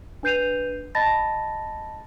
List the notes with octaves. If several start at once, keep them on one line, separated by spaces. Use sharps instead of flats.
D4 B4 G6 C7 D#7 F7
D#5 A5 B5 A6 A#6